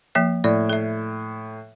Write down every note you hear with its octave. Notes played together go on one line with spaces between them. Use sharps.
F3 A#3 E5
A2 D5
A4 E5